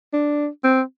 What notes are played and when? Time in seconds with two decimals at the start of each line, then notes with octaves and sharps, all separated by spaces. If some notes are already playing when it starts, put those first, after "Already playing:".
0.13 D4
0.64 C4